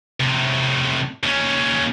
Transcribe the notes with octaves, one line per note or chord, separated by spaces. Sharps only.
A2 C3
D#2 C#4